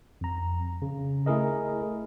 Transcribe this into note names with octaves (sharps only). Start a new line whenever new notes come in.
F2 A#5
C#3
A3 E4 G#4 A#4 D#5